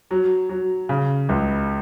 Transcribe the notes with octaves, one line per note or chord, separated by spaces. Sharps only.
F#3
F#3
C#3
C#2